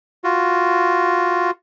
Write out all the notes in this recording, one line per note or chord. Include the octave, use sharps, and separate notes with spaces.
F4 F#4